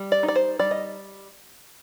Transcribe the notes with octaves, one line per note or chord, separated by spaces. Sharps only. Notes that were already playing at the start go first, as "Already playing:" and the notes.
Already playing: G3
D5
D#4
D5
C5
G3 D5
D#5